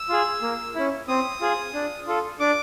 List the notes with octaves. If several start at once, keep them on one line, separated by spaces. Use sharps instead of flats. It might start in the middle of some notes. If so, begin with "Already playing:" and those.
Already playing: E6
F4 G#4
A#3
C#4 E4
C4 D#6
F4 G#4
D4
F4 A4
D4 D6